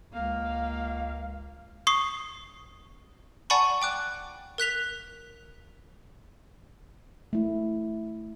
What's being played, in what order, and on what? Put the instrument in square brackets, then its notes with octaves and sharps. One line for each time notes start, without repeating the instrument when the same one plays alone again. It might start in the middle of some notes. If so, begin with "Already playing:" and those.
[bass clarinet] C#2 [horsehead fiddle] A#3 F5
[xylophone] C#6 D#6 C7
D5 F#5 G#5 A5 B5 C#6
G5 D6 F#6
A#4 F#6 B6 F7
[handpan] A3 E4